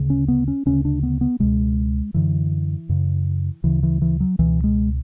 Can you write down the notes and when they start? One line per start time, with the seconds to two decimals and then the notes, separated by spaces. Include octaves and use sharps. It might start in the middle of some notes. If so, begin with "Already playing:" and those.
Already playing: D2 C#3
0.10 C#4
0.28 B3
0.48 C#4
0.66 D2 C#3 C#4
0.85 D4
1.03 B3
1.21 B3
1.40 C#2 B2 G#3
2.14 F#2 D3 E3
2.89 F#2 C#3
3.64 D2 C#3 E3
3.83 E3
4.02 E3
4.20 F#3
4.39 C#2 B2 E3
4.64 G#3